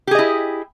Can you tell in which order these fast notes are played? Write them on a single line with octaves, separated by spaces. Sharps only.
G4 G#4 D#5 E4